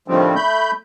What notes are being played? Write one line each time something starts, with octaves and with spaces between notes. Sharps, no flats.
A2 D3 D#3 F3 G3 C4
A3 B5 G6